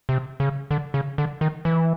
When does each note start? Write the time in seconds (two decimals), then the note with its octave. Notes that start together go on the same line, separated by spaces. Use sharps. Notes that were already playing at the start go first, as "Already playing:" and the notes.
0.09 C3
0.40 C#3
0.71 D3
0.94 C#3
1.18 D3
1.41 D#3
1.65 E3